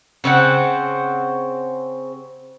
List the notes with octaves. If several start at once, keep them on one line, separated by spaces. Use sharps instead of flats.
C#3 C4 C5 F#5